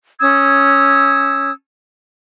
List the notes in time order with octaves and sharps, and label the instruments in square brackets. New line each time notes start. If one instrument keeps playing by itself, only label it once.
[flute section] C#4 D#6 E6 G#6